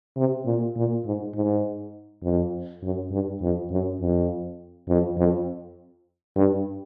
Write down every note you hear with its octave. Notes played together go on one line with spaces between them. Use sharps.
C3
A#2
A#2
G#2
G#2
F2
F#2
G2
F2
F#2
F2
F2
F2
G2